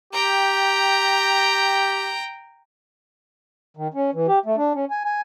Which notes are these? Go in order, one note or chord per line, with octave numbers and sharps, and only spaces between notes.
G4 G5 A#5
D#3
C#4
E3
G4
A3
D4
C#4
G#5
G#5